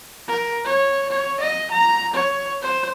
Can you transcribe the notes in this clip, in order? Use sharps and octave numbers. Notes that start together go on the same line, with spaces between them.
A#4
C#5
C#5
D#5
A#5
C#5
C5